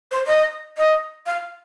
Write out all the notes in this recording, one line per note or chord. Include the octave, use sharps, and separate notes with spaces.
C5
D#5
D#5
F5